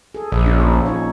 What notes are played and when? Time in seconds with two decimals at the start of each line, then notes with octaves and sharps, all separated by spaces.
0.15 G#4 A4
0.32 A#1 D5
0.46 F3 C#4 D4
0.60 A#2 F3
0.73 C#4 E5
0.86 D#4 C#5